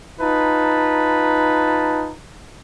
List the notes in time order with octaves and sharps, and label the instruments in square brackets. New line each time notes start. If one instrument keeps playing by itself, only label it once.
[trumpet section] D#4 F4 B4 A5 A#5